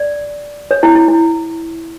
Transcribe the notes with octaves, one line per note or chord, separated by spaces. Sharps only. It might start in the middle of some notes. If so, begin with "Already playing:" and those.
Already playing: D5
C#5
E4
E4
E4